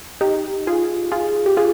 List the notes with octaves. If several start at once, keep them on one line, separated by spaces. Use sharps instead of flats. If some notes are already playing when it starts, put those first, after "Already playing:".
D#4 G4
F4 G#4
F4 G#4
G4
F4 G#4